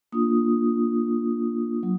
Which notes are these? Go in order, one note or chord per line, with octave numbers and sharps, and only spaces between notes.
A#3 D4 F4 D#6
F#3